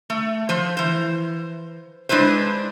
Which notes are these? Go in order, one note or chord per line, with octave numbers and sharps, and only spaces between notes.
A3
F3 C5
E3 C5
G#3 D4 E4 B4 C5